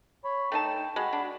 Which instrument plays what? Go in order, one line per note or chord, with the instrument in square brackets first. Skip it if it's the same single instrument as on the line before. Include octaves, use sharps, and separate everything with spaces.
[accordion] C#5 B5
[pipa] A3 D#4 A5 [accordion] G5
[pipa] G#3 [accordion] F#4 B5
[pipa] D4